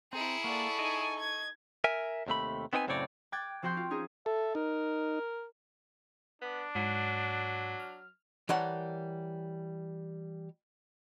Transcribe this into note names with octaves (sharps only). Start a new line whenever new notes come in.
C4 E4 G#4 A#5 C#7
A#3 A4 D5 F#5 C#6
D#4 D#5 G#5
G#6
A#4 E5 G#5
D#2 C3 A3 B5
B3 C4 D#4 B4 G5 G#5
F#2 A2 C#3 C4 C#5 D5
G5 D6 F#6 G#6 A6
F3 C4 F#4 G5 C6 G6
F4
C#4 D#4 G#4
A4 E5
D#4 A#4
B3 D4
G#2 F#3
F6
E3 G3 A#4 C#5 F#5 A5